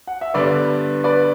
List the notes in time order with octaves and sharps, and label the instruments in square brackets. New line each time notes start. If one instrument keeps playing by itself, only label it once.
[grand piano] F#5
E5
[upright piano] G2 D3 G3 B3 [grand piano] B4 D5
[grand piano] B4 D5